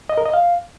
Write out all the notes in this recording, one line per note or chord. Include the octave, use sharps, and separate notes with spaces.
D#5
A#4
D#5
F5